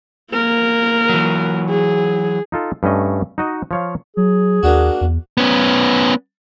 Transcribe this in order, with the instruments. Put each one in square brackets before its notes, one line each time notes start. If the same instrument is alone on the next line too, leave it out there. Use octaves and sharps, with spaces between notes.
[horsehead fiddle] A#3 A#4
[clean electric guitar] E3 F#3
[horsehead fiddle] G#4
[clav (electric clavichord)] D#4 F4 A4
G2 A3 C#4 D#5
D#4 F#4 D#5
F3 C#5 F5
[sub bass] F#3 [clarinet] G#4
[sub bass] D#2 [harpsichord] A#3 D4 F#4
[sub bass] E2
[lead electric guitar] B3 C#4